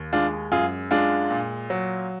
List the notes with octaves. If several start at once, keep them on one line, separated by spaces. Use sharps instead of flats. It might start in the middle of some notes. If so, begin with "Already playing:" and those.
Already playing: D#2
G#3 D4 F4
F#2 F4 G#4
G#3 D4 F4
A#2
F#3